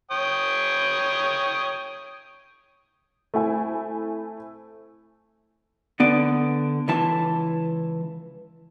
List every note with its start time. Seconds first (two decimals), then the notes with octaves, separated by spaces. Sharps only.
0.11 C#5 G5 D#6
3.34 A3 C4 E4 G#5
6.00 D3 B3 D5
6.88 C#2 E3 A5